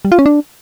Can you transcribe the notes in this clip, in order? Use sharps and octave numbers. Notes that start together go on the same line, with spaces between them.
G3
F4
C#4
D4